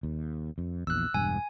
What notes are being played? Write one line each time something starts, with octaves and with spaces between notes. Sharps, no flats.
D#2
F2
A#1 E2 E6 F#6
E1 G2 G#5